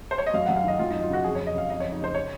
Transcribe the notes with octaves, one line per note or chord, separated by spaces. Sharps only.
C5
C#5
D#5
F#2 F5
F#2 F#5
F5
D#3 D#5
F#2 F4
D#4
F#2
F4
C#3 F#4
F2 G#4
C#5
F2
D#5
C#3 F5
F2 D#5
C#5
F2
D#4
C#3 C5
C#5